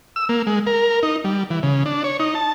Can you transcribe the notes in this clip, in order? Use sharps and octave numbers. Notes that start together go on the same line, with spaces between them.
E6
A#3
G#3
A#4
D#4
G3
E3
C#3
D4
C#5
D#4
A5